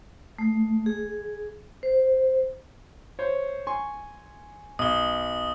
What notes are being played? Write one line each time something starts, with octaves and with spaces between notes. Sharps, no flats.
A3
G#4
C5
C5 C#5
G#5 C6 C#6
B1 D#6 G7